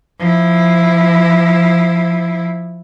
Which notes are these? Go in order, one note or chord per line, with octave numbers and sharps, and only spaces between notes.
F3 E4